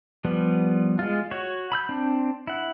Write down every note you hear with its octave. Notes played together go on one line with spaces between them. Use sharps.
F3 G3 B3
G#3 F4
F#4 C#5
B5 E6 G6
C4 D4
E4 F#5